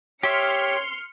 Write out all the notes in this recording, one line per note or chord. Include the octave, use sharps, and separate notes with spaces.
G4 C#5 E5 C6 F6 C#7